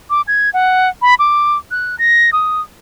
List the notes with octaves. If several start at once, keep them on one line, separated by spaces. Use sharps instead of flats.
D6
G#6
F#5
B5
D6
F#6
A#6
D#6